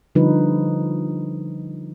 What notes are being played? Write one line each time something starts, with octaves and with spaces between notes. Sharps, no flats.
D3 F3 G3 D#4 B4